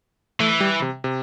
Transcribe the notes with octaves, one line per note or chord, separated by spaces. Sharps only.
E3 A3
G3
C3
C3